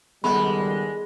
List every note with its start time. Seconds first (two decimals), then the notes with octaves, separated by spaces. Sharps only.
0.24 C#2 D#3 G3 G#3 B3 A4 F#5 B5